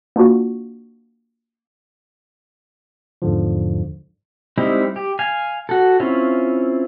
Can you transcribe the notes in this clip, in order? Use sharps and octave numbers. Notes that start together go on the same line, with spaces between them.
A#3 D4 F4 F#4
E2 G#2 D3 F3
G3 G#3 C4 D#4 E4
G4
F5 G#5
F#4 A4
C4 C#4 E4 F4